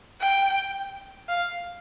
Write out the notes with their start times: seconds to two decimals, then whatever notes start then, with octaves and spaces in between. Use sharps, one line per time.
0.21 G5
1.29 F5